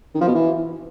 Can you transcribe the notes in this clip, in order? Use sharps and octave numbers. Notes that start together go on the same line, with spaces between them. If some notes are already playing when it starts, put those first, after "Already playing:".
D#3
F3
B2
E3